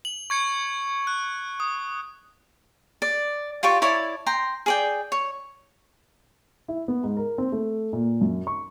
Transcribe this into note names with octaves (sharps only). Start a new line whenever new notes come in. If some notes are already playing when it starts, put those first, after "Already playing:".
F#7
C#6 G#6 C#7
F#6
D#6
D5
F4 G4 D5 C#6
E4 C#5 D5 A5
G5 A#5 C6
G#4 D5 G5
C#5
E4
B3
G#2
A#4
C4
A3
A#2
F#2
C#6